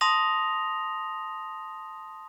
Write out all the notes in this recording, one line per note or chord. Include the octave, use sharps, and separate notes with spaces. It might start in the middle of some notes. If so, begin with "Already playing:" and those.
A5 C6 D#6 A#6 F7